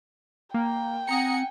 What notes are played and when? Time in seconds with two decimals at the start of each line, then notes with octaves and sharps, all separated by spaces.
0.54 A#3 G5
1.09 C4 F#5 G#5 A#5 D#6 A#6 C#7